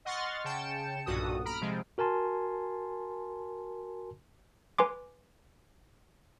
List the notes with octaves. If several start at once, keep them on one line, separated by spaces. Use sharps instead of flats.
D#5 F#5 C6 C#6 F6 A6
C#3 G5 A5 C#7 E7
B1 G2 A#2 F#4 A4 D#6
A#5 B5 F6 D7
C3 F3 G#3
F#4 A#4 G#5 A5 C6
B4 G#5 C6 D6